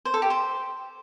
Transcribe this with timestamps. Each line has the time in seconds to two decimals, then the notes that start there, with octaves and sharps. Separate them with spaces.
0.05 C5
0.14 A4
0.22 G4
0.30 C5